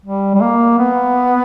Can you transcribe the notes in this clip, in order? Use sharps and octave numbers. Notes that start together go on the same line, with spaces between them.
G3
G3
A#3
B3